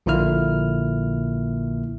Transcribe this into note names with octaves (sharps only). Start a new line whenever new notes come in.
A#1 A#2 D3 A#3 E4 F6